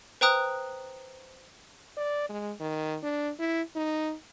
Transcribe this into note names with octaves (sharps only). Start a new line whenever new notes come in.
B4 C5 G5 A#5 D#6 F#6
D5
G#3
D#3
D4
E4
D#4